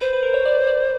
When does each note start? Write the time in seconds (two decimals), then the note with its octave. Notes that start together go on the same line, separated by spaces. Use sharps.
0.01 B4 C5
0.13 B4
0.23 A#4
0.34 C#5
0.45 D5
0.67 D5